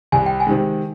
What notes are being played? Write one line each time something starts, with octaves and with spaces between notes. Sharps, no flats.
C2 G#5
G5
G#5
C3 D#3 G#3